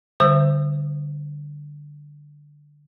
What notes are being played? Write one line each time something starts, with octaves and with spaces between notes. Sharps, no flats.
D3 G3 C5 E6